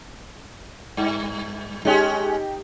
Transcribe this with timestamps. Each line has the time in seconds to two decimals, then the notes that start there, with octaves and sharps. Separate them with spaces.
0.97 G2
1.85 G#3 C#4 D#4 G4